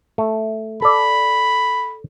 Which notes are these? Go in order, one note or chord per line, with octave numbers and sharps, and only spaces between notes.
A3
A4 D5 B5